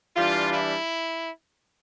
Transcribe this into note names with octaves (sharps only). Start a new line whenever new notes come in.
E3 G3 D4 F4
E4